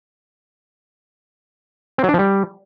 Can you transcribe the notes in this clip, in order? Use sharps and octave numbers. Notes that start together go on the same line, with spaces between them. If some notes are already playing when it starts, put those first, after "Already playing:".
C4
F#3
D4
F3
G3